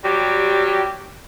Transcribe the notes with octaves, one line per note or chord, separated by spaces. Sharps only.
F#3 G3 G4